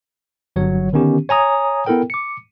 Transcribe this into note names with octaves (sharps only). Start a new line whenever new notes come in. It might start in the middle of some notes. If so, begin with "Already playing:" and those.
G1 F#3 C#5
D3 D#3 B3 C#4 G4
C#5 G#5 A#5 D#6
B3 E4 A4 A#4 G5
D6 C#7